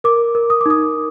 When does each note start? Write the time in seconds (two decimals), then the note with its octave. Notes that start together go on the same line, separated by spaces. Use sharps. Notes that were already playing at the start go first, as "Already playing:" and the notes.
0.04 A#4 D6
0.35 A#4
0.50 D#6
0.61 D6
0.66 D#4 D#6